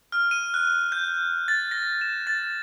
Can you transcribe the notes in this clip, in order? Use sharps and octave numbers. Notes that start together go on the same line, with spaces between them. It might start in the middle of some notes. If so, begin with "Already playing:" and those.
F6
D#7
F#6
G6
A6
A#6
E7
A6